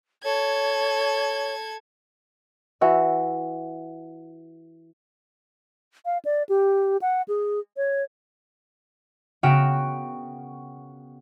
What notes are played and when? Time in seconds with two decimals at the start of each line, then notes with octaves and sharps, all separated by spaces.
0.24 A4 C#5 G#6
2.81 E3 F#4 E5
6.05 F5
6.25 D5
6.49 G4
7.02 F#5
7.28 G#4
7.77 C#5
9.43 C#3 B3 F#4 A#4 G5 E7